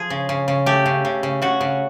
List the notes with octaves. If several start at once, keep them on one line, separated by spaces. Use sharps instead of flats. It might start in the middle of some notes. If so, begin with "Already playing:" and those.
Already playing: F3 G#4
C#3
C#3
C#3
A3 G4
C#3
C#3
C#3
C#3 F#4
C#3